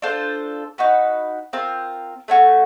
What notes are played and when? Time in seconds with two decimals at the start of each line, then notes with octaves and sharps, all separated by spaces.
0.02 D4 F4 A4 C5
0.78 D#4 F#4 B4
1.53 C4 F4 A#4
2.28 A3 C#4 F#4